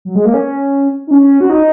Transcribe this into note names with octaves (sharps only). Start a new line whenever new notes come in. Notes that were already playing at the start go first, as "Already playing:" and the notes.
F#3
G#3
A#3
C#4
D#4
C#4
F#4
D#4